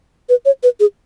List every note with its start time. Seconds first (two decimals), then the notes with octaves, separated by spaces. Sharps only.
0.29 B4
0.45 C#5
0.63 B4
0.79 G#4